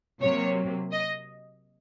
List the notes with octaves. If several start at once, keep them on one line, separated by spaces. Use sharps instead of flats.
C3 F#3 A#3 C#5
D#5